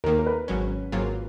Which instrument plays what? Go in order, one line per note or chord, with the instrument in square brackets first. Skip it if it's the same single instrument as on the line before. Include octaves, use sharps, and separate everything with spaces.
[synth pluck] D#2 D#3 A#3 [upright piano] A#4
[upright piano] A#4
B4
[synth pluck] G#1 G#2 F#3 C#4
G#1 G#2 F#3 A#3 F4